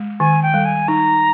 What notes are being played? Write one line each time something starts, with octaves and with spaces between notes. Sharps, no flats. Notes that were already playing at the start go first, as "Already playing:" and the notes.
Already playing: G#3
D#3 G#5
G5
G3
G#5
D#4 A#5